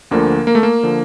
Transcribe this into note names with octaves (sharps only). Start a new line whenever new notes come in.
D2 D3 F3 A#3
A#3
A3
A#3
D3 F3